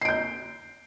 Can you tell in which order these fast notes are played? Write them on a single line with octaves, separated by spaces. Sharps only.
C7 D7 G6